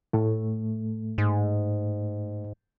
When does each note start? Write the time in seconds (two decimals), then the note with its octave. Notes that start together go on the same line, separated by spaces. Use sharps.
0.13 A2 A3
1.18 G#2